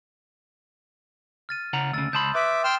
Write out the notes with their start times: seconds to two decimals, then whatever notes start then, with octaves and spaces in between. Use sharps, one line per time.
1.49 F6 A6 D#7
1.73 C#3 F#5 A#5
1.93 D2 C#3 E6 A6
2.13 C#2 A5 B5 C6 D#6 G6
2.35 B4 E5 D6
2.64 G5 C6 F6 E7